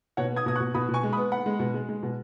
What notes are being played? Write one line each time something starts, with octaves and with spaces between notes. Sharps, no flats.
B2 C#5 F#5
B3 D#6 G#6
B2 D#6
C#6 F#6
B2
B2 B5 D#6
B2
G#5 C#6
G#3
B5 D#6
B3
B3 F#5 B5
G#3
B2
G#3
G#3
B2